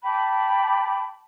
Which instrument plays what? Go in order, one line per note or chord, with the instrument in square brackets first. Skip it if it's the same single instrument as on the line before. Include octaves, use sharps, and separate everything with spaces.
[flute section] G5 A5 B5 D6